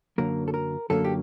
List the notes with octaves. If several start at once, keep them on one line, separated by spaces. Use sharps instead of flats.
F#2 D3 F#3 A#3 A#4
A4
A#4
F#2 D3 F#3 A#3 A4
G4